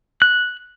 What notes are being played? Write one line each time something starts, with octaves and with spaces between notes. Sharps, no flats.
F#6